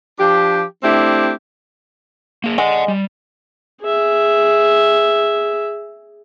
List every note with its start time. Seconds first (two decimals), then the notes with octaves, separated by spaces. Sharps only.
0.19 F3 D4 G4
0.84 A3 C4 D4 E4 G4
2.44 A#3 G#4
2.58 G#3 D5 F#5
2.88 G3
3.82 G#4 E5